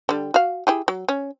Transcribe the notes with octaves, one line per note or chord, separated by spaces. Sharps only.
D3 G3
F#4 F5
E4 G4 G#4
F#3
C#4